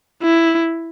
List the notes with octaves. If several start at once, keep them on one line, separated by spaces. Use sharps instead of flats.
E4